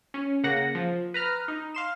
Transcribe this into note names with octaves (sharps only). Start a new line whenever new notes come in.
C#4
C#3 A#3 F#5 A#6
F3
B4 A#5 F6
D#4
F5 C6 E7